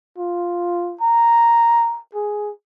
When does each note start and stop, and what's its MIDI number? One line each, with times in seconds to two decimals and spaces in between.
0.18 0.96 65
1.01 1.99 82
2.14 2.51 68